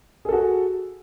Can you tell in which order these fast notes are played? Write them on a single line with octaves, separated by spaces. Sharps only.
G#4 A4 F#4